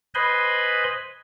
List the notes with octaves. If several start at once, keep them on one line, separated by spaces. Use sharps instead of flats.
B4 C5 D#5 G#5 B5 C6